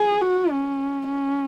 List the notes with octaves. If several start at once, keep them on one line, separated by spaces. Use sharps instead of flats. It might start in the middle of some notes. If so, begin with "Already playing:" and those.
Already playing: G#4
F#4
C#4
C#4